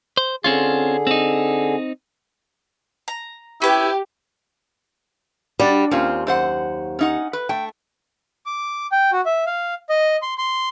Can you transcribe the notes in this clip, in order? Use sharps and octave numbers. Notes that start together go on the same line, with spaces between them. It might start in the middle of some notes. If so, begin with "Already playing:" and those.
C5
D3 C4 C#4 F4 G#4
C4 D#4
A#5
C#4 E4 G4 B4
G3 D4 F#4
D#2 C4 C#4 F4
F#2 C5 F#5
C#4 D#4 F#5
B4
A3 G5
D6
G5
F#4
E5
F5
D#5
C6
C6